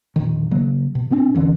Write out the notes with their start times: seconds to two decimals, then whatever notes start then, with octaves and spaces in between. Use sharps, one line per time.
0.16 E1 A#1 D#3
0.51 C#3 F#3 A#3
0.95 B2
1.10 B2 B3 C4 D4
1.35 E2 D3 E3 C#4